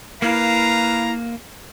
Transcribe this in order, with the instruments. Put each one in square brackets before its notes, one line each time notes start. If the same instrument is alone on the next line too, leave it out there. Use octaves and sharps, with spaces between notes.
[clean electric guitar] A#3 [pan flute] E4 [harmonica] B4 F5 [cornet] A#5